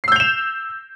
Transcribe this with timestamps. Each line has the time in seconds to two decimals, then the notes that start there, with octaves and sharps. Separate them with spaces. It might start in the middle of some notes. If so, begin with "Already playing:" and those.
0.04 C7
0.08 E6
0.12 G6
0.16 F7
0.20 E7